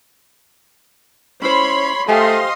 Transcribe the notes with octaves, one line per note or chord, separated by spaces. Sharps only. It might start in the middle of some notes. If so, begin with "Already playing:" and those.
C#4 E4 C5 C#5 B5 C6
A3 G4 C5 D#5 F5 G#5 C6